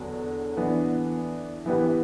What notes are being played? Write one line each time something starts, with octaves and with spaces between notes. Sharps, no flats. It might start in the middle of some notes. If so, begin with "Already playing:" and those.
Already playing: E2 D3 F#3 B3
E3 B3 D4
E3 B3 E4 G4 B4